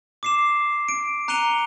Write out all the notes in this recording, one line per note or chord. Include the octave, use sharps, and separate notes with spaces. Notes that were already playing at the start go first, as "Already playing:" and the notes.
D6 C7 E7
D7
A#5 F#6 C#7 D#7 F7 G7